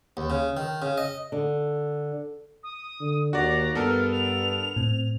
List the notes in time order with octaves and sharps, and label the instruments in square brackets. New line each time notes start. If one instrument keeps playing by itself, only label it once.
[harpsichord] D#2
C#3
D#3
C#3
D#5
[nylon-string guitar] D3
[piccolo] D#6
[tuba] D3
[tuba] D#2 [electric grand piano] F#4 D5 [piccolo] A#5
[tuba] G2 [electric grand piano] B3 A4 A#4 [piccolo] F6
[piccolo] F7
[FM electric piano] A2 [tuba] C4